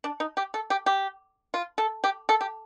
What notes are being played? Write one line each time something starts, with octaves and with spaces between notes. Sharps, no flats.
D4
D#4
G4
A4
G4
G4
F4
A4
G4
A4
G4